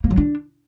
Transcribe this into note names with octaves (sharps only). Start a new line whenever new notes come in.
A#3
F#3
D4